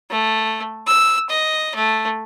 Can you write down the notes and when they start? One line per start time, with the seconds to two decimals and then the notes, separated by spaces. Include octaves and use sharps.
0.10 A3
0.87 E6
1.29 D#5
1.75 A3